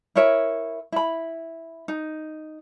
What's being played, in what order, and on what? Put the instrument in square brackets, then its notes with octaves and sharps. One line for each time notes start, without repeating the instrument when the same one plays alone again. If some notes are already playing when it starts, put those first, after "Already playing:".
[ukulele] E4 A#4 C#5 E5
E4 B5
D#4